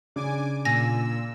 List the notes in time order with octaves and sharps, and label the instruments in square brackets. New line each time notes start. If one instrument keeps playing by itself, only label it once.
[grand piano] C#3 D4 [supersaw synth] G#5 D6
[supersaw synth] A#2 E6 [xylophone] G#5 A#6